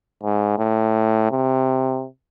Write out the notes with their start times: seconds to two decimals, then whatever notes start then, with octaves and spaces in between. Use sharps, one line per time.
0.23 G#2
0.58 A2
1.31 C3